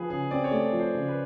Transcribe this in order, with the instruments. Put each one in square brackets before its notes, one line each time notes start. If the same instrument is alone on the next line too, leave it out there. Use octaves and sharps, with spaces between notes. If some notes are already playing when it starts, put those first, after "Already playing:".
Already playing: [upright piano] F3 [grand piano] G#4 B4
[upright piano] C#3 [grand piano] G#4
[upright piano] C4 [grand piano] D5
[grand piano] C#5
[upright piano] A3 [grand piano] D5
[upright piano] F3
[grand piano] C5
[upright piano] C#3
[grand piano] B4